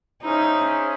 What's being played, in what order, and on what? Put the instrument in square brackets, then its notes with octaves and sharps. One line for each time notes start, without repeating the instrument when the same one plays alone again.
[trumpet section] C#4 E4 G#4 C5 [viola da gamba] D#4